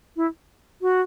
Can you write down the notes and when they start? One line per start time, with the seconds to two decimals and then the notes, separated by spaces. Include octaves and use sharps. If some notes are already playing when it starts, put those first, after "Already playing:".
0.17 E4
0.82 F#4